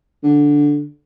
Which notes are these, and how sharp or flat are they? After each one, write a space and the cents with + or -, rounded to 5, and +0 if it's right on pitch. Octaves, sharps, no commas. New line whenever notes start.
D3 -5